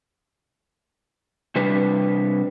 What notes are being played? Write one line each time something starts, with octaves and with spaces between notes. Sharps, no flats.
C3 G3 D4 B4